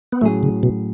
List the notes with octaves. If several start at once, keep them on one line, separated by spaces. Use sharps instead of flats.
B3
A2 F#3 A3 C#4 G#4
C#3
B2